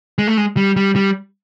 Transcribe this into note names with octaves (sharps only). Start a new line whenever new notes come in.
G#3
A3
G#3
G3
G3
G3